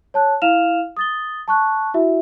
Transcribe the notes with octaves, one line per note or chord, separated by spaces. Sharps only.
C#5 A5 F#6
E4 F5 F6 E7 F7
D#6 A6 G7
A5 C#6 F#6
E4 F#4 E5